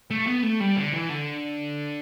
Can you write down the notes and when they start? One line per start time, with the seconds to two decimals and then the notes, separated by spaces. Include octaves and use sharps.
0.11 A3
0.27 B3
0.43 A3
0.60 G3
0.77 D3
0.93 E3
1.09 D3